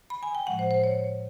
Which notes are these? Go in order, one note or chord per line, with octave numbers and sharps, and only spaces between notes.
B5
G#5
G5
A2 F3 G#3 F#5
C5
C5
C#5